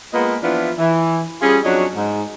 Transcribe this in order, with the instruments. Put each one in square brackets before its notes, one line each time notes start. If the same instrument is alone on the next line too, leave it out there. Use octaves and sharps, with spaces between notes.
[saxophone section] G#3 A#3 B3 F4 B4 D#5
E3 F3 B3 D4 E4 F4
E3
G3 C#4 F4 G#4
F2 F#3 C#4 D4 F#4 D#5
G#2